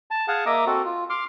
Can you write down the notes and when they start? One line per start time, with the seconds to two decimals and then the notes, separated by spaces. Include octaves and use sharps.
0.11 A5
0.28 G#4 F5 F#5 G#5 A5
0.46 A#3 D#5 E5 A#5 D6 D#6
0.66 C4 F#4 A4
0.85 F4
1.10 C6 D6 F6